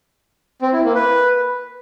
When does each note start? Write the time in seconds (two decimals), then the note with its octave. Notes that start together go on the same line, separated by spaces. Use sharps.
0.62 C4
0.73 E4
0.84 A#3
0.95 B4